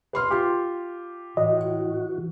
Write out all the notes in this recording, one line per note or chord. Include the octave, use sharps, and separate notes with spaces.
B4 C6 F6
F4 G4
A2 E3 F#4 D#5